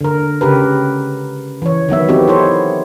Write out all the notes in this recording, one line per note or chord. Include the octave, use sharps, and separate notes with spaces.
D3 A#4
C#3 G4 A#4 B4
E3 C#5
D#3 F#3 B3 E5
B3 C4 D#4 F#4 G4
E4 A4 C5 C#5